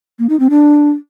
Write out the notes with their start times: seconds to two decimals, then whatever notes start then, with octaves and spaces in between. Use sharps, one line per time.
0.19 A#3
0.29 D#4
0.40 C4
0.50 D4